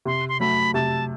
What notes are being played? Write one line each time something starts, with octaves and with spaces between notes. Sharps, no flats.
C3 C6
C6
F#3 A3 B5
C3 A5